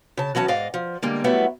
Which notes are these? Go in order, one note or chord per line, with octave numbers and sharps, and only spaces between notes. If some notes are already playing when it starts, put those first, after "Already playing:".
C#3 A5
E3 F#3 C#4 A5
G#2 D5 D#5 F5
F3
D3 G3 G#3 A#3
F#3 G3 A3 B3 E4 E5